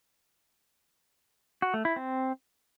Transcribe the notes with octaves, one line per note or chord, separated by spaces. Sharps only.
F#4
A3
E4
C4